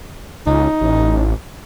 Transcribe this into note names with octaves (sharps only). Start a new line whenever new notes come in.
C#2 D#4
A1